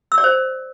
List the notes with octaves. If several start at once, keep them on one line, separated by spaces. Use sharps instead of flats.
E6
D5
C5